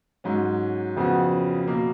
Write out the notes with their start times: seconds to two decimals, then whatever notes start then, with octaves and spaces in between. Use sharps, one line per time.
0.24 G#2 F#3 C#4
0.96 F2 C#3 F3 B3 F#4
1.67 B2 A#3